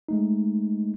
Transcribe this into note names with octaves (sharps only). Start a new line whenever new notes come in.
G#3 A3 D#4